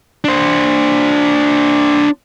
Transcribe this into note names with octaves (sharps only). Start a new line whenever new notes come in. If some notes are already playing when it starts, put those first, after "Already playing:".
D4 C5